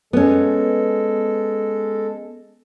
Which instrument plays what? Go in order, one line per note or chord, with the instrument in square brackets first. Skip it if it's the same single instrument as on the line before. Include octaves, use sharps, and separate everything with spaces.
[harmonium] G#3 A4 [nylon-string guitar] B3 C#4